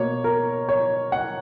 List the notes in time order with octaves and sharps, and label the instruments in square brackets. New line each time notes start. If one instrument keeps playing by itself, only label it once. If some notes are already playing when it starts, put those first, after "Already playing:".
Already playing: [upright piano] B2 A#3 C#5
A#4
C#5
F#5